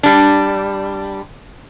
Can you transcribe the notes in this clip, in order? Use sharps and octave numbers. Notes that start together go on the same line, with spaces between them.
G3 D4